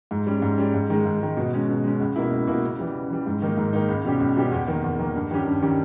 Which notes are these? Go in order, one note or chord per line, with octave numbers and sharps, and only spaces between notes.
G#2
G3 C#4
G#2
G3 C#4
G#2
D#3 G#3
G#2
D#3 G#3
B2
G#3 C#4
B2
G#3 C#4
C#2
B2 A#3 E4
C#2
B2 A#3 E4
C#3
E3 G3
C#3
E3 G3
G#2
D#3 A#3 D#4
G#2
D#3 A#3 D#4
C#2
B2 G3 C#4 G4
C#2
B2 G3 C#4 G4
E2
D#3 A#3
E2
D#3 A#3
G2
D#3 G3 C#4 G4
G2
D#3 G3 C#4 G4